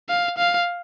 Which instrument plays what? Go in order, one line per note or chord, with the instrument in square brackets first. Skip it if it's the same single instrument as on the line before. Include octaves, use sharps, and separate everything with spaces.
[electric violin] F5
F5